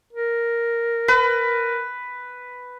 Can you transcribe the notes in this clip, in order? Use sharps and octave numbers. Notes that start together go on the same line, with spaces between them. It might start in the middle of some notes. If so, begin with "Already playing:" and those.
A#4
B4